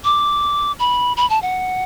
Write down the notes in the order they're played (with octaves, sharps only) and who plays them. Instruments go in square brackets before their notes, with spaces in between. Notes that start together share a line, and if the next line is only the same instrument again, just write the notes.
[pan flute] D6
B5
B5
A5
F#5